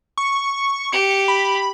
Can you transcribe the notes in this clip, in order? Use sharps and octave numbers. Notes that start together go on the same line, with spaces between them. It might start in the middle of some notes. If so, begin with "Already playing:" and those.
C#6
G4 C#7
B5